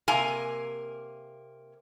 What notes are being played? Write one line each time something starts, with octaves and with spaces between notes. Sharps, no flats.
C3 A#3 G#5 A#5